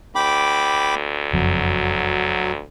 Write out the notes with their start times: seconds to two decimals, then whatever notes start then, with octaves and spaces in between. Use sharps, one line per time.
0.15 D2 G5 B5 D6
1.33 F#1 F2 F#3